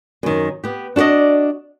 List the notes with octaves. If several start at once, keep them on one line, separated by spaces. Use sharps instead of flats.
F#2 D#3
B3 G4
D4 F#4 A4 D5 D#5